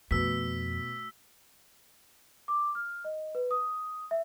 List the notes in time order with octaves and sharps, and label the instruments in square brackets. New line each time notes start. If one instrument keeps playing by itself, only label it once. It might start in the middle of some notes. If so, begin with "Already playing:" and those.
[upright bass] F2 [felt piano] B2 B4 [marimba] A3 F#4 [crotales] E6 B6
[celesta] D6
F6
D#5
B4
D#6
E5